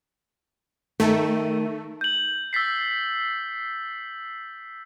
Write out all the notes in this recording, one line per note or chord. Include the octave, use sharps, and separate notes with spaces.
D#3 A3
G6 F#7
E6 A6 B6 C7